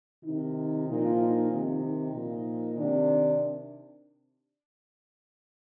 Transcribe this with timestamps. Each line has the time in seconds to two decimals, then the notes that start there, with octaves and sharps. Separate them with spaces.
0.24 C3 D#3 D#4
0.87 A#2 F3 D#4
1.18 D#4
1.50 C3 D#3
1.81 D#4
2.13 A#2 F3
2.75 C3 D#3 D4